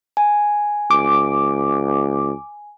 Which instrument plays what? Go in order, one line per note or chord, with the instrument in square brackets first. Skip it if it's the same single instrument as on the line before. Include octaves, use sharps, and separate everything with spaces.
[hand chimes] G#5
[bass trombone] C#2 [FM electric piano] D6